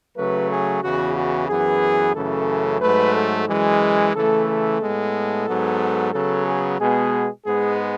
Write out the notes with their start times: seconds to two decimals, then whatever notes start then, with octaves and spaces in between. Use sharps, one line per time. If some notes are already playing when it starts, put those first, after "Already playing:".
0.17 C#3 F#3 A3 B4
0.50 G#4
0.83 E2 C#3 E3 F#4
1.16 F#4
1.49 F#2 E3 B3 G#4
2.15 F#2 C#3 E3 A3 A4
2.81 G#2 F#3 A3 B4
3.15 A4
3.48 F#2 E3 G#3
4.14 C#3 E3 A3 A4
4.48 A4
4.81 A2 G#3 B3
5.47 G#2 F#3 B3
6.13 C#3 F#3 B3 A4
6.47 G#4
6.79 B2 G#3 B3 G#4
7.46 G#2 G#3 B3 G#4